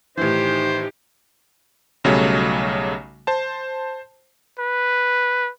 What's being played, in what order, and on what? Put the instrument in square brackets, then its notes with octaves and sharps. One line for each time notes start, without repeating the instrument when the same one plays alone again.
[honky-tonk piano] A2 D#3 E3 [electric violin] D#4 G4 [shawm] C5
[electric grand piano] B1 C#3 F#3 G3 A3
C5 A5
[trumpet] B4